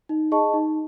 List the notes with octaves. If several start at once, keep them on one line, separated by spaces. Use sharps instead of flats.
D#4
G#4 D#5 A5 C#6
D#4